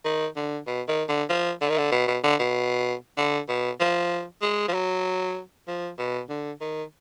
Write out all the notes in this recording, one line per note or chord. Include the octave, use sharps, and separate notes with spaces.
D#3
D3
B2
D#3
D3
F3
D3
D#3
D3
B2
B2
D3
B2
D3
B2
F3
G#3
F3
F#3
F3
B2
D3
D#3